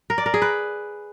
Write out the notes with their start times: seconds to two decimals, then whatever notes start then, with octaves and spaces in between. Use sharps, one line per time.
0.10 A#4
0.18 D5
0.26 A#4
0.34 G#4
0.42 B4